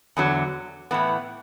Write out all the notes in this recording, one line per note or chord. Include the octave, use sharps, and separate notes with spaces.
E2 D3 F#3
A2 E3 B3